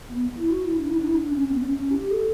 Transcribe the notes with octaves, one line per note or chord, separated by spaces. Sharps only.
B3
E4
F#4
E4
D4
E4
D4
E4
D4
C#4
C#4
B3
C#4
C#4
G4
A4